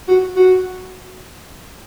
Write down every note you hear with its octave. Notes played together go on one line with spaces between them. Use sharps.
F#4
F#4